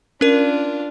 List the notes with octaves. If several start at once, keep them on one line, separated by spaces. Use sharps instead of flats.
C#4 D4 F4 A#4